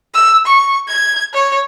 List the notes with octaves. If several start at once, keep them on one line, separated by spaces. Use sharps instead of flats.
E6
C#6
G#6
C#5